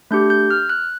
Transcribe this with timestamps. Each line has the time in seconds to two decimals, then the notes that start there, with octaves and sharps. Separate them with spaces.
0.11 A3 D4 G4 G6
0.30 G6
0.50 F6
0.69 F#6